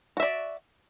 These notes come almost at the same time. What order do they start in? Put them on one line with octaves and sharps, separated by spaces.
F#4 E5 D5